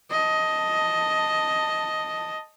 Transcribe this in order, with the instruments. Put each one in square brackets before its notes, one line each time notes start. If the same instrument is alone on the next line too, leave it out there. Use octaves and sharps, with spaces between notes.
[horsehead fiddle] D#5 A5